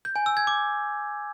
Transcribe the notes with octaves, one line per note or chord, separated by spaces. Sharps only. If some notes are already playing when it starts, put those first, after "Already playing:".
G6
G#5
E6
G#6
D6